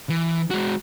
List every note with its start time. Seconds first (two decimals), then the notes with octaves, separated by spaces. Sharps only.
0.10 E3
0.51 G#3 F#4